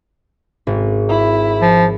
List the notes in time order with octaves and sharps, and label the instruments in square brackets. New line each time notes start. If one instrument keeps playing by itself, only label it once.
[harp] G#1
[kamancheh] E4
[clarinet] F3